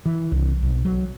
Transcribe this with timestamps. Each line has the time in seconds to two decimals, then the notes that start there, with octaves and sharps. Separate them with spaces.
0.06 E3
0.32 C2
0.63 B1
0.85 F#3